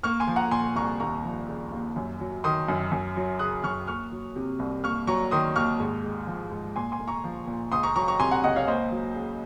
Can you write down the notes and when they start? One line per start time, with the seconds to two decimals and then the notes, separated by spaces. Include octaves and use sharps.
0.03 A#3 C#6 F6
0.20 G#5 C6
0.27 F3
0.36 F#5 A#5
0.51 A#2 G#5 C6
0.76 C2 A#5 C#6
1.00 D#2 A#5 C#6
1.24 F3
1.48 C#3
1.72 D#2
1.96 F#2
2.20 F#3
2.44 D#3 C6 D#6
2.69 F#2
2.92 F#2
3.17 F#3
3.39 C#3 D#6 F#6
3.63 F#2 C#6 F6
3.87 A#3 C#6 F6
4.12 F#3
4.36 C3
4.59 C2
4.84 A#3 C#6 F6
5.07 F#3 A#5 C#6
5.31 D#3 C6 D#6
5.56 D#2 C#6 F6
5.80 G#2
6.03 G#3
6.27 F3
6.52 G#2
6.76 A#2 G#5 C6
6.92 G#5 C6
6.99 A#3
7.07 A#5 C#6
7.24 F3
7.47 A#2
7.72 C#2 C6 D#6
7.83 A#5 C#6
7.96 F#3 A#5 C#6
8.08 A#5 C#6
8.20 C3 G#5 C6
8.31 F#5 A#5
8.44 C#2 D#5 F#5
8.56 C#5 F5
8.67 A#3 C5 D#5
8.91 F#3
9.16 C#3